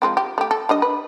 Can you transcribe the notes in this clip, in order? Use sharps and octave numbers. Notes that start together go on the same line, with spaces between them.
F3 G#3 C4
G4
A3 G4
A4
G3 D4 D#5
B4